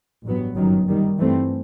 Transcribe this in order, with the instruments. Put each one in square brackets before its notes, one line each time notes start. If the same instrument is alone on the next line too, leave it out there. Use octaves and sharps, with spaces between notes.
[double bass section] A1 G2 F#3 B3
G1 F#2 D#3 F#3
D#2 D#3 G3
G2 E3 A3 C4